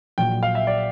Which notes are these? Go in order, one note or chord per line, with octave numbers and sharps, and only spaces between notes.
A#1 A#2 F#3 G5
F5
E5
D5